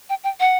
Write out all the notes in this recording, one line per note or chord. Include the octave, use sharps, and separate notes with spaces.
G5
G5
F#5